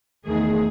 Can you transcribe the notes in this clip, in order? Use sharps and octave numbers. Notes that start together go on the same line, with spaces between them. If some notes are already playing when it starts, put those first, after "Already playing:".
E2 D#3 A3 G#4